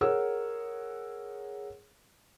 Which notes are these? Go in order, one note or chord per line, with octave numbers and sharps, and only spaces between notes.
G#4 A#4 C#5 F#5 E6